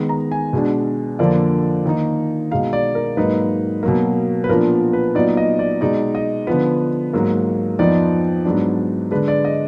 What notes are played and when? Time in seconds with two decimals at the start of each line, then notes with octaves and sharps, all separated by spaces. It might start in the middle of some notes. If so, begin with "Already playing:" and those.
Already playing: D#3 G#3 B3
0.09 A#5
0.32 G#5
0.53 B2 G#3 D4
1.19 F2 D3 F3 A#3 D4 D5
1.86 D#3 A#3 D#4
2.51 B2 G#3 D#4 F5
2.73 D5
2.95 A#4
3.17 G#2 F#3 A#3 D#4 B4
3.83 B2 F#3 A#3
4.44 B4
4.49 A#2 F3 B3 D4 A#4
4.93 B4
5.15 A#2 F#3 B3 D#4 D5
5.37 D#5
5.59 D5
5.81 B2 G#3 D#4 D5
6.15 D#5
6.47 D3 F3 B3 B4
7.13 G#2 F#3 A#3
7.79 F2 F3 B3 D#4 D5
8.45 G#2 F#3 B3 D4
9.11 D3 G#3 D4 B4
9.28 D5
9.45 D#5